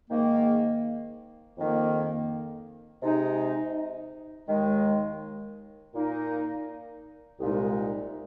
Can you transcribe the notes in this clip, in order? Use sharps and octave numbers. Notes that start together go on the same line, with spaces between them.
G#2 D#3 A#3
F2 D#3 A#3
C3 G#3 D#4
D#2 D#3 G#3
A#2 A#3 D#4
C2 A#2 G#3 D#4